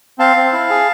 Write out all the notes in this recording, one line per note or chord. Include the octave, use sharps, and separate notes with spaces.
C4 F5 A5
C4
E4
G#4